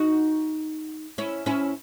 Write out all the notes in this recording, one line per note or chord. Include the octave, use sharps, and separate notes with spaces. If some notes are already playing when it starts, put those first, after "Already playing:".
Already playing: D#4 F#4
C#4 E4
C#4 E4